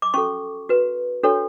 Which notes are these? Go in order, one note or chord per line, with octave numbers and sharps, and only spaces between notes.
D6
C#4 F#4 A4 C#6
F#4 B4
D4 F#4 A4 C#5